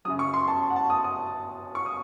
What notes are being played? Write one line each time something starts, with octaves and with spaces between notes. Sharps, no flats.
F#2 C#3 F#3 D#6
C#6
C6
A5
F#5
A5
D#6
D#6
C#6
D#6